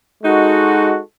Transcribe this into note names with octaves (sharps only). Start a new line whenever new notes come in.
G#3 D#4 F#4 A4